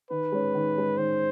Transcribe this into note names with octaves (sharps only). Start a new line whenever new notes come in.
D#3 B4
G#3 C#4
D#3
G#3 C#4
D#3 C5